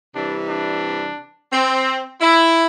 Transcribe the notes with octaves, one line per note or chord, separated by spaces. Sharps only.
C3 E3 G3 D4
D4
C4
E4